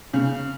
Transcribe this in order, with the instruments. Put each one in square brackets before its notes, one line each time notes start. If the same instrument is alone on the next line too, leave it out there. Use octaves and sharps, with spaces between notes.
[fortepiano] C#3